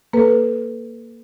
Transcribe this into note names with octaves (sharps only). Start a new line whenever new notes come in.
A#3 A4 B4